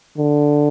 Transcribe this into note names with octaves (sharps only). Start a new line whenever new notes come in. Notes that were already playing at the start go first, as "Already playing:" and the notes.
D3